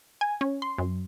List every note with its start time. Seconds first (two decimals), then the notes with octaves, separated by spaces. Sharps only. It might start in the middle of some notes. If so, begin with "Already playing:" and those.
0.21 G#5
0.41 C#4
0.62 C6
0.78 F#2